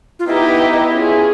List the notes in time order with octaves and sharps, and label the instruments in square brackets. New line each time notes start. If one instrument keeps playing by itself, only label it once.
[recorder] F4
[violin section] B3 D#4 G4 B4 D#5 [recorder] E4
[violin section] C#4 F4 G#4